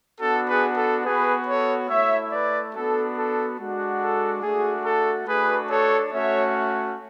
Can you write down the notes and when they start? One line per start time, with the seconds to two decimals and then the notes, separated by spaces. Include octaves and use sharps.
0.21 B3 D4 F#4 A4
0.48 G#4 B4
0.77 A4
1.05 B3 F#4 G#4 B4
1.47 A4 C#5
1.89 A3 E4 C#5 E5
2.32 B4 D5
2.74 B3 D4 F#4 A4
3.17 A4
3.59 G#3 D4 F#4
4.01 A4
4.43 A3 D4 F#4 G#4
4.85 A4
5.27 A3 D4 F#4 G#4 B4
5.70 A4 C#5
6.12 A3 C#4 F#4 C#5 E5